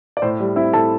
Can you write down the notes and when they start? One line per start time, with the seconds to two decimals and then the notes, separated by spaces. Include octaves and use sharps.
0.17 D5
0.22 A2 C5
0.40 G3
0.56 C4 E4 E5
0.73 A2 A4 A5